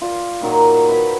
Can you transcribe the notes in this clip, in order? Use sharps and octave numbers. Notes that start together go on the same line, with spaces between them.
F4 D5
A#2 D#3 F#3 G3
B4 B5